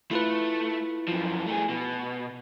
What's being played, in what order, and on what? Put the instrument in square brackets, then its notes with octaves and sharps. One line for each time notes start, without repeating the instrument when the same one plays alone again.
[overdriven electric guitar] A3 [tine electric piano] E4 F4 B4
[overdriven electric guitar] F#2 F3
A3 G#4
B2